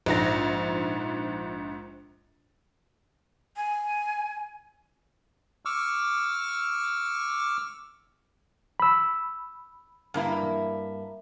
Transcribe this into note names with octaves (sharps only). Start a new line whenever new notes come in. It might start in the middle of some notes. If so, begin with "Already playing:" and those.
A#1 G#2 A#6
G#5
C#6 D6 E6 F6
B5 E6
G2 A#3 E4